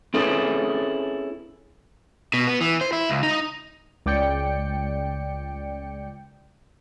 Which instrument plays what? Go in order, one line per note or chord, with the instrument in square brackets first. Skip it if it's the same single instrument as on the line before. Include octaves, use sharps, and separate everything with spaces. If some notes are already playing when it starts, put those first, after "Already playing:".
[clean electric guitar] C4 C#4 E4 G#4 A4 B4
[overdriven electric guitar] B2
B3
E3
C5
E4
C#2
D#4
[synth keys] C#2 D5 G5 C#7